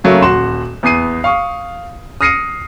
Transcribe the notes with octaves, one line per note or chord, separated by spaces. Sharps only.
C#3 F#3 A3 A#3
D#1 F#4 C6 E7
E2 B3 D#6 C7 D#7
F5 C#6 D#6
D#6 F6 A#6 C7 C#7 D#7